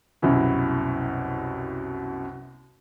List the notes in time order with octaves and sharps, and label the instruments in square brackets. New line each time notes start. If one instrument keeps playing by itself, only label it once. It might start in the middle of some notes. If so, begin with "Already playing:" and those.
[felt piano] C2 F#2 B2 E4